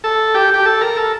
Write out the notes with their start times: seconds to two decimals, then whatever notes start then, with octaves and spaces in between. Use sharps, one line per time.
0.04 A4
0.35 G4
0.54 G4
0.66 A4
0.81 A#4
0.96 A4